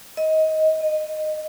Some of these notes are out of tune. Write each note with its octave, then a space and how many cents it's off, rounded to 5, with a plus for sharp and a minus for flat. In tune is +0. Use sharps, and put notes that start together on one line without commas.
D#5 +20
D#5 -15